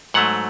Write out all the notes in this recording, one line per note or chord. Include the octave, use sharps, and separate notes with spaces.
G#2 F#3 A3 F#5